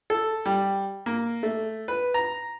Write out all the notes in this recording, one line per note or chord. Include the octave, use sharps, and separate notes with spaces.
A4
G3
A#3
A3
B4
A#5